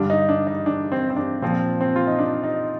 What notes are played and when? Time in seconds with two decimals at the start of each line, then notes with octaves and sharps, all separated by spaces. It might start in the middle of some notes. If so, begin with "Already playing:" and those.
Already playing: G2 D3 G3 D4
0.10 D#4
0.29 D4
0.47 D#4
0.66 D4
0.92 C4
1.10 C4
1.16 D4
1.42 A#2 F3 C4
1.81 C4
1.96 F4
2.07 D#4
2.19 D4
2.44 D#4